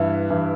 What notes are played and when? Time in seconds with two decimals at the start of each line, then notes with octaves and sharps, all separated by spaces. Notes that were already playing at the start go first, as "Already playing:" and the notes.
Already playing: G2 E3 E4
0.30 G2 E3